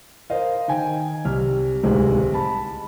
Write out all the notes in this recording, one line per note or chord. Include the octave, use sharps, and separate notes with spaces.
A#4 C5 D#5 F5
D#3 G5 G#5
C2 F6
D1 C2 D#3 G#3 C4
A5 B5